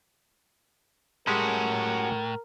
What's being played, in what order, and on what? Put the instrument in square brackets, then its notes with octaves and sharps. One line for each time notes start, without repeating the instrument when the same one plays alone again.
[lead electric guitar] A2 [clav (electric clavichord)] G3 G#3 G4 [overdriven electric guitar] C#4 F#4 [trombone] A#4